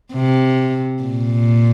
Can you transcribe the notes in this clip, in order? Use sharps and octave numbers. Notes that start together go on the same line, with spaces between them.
C3
A#2